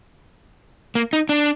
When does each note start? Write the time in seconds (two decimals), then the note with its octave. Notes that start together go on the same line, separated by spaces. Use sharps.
0.95 A#3
1.13 D#4
1.29 D4